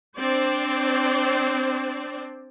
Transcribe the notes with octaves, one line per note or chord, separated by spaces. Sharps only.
C4 D4 C5 D5